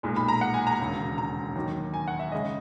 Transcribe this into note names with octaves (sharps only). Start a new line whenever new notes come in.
B1 A#2 G#3
B5
A#5
F#5
G#5
A#5
E1 D#2 C#3 G#3
A#5
D#2 D#3 F#3
G#5
F#5
E5
C#3 G#3 D#5